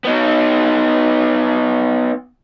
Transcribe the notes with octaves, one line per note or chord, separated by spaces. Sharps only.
B3 D#4